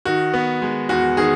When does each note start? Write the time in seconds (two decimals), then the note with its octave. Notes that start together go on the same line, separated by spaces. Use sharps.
0.05 D#3 F#4
0.34 B3
0.62 G#3
0.89 E2 F#4
1.17 D#3 G#4